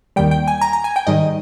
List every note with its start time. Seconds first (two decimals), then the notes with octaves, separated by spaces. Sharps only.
0.16 D#2 D#3 G3 G5
0.31 G5
0.48 G#5
0.61 A#5
0.73 A#5
0.84 G#5
0.96 G5
1.07 G#2 D#3 G3 D#5